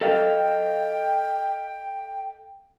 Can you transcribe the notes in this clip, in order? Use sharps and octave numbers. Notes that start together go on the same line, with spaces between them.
A4 D#5 F5 G5